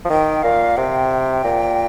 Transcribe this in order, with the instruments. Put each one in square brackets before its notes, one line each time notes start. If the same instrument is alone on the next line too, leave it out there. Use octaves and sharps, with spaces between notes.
[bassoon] F3
[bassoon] D#3 [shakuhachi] G5
[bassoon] A#2 [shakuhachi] F5
[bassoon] C3 [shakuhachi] G5
[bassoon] A#2